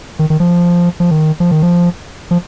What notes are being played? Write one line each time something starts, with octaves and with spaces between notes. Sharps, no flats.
D#3
D#3
F3
F3
D#3
F3
D#3
F3
F3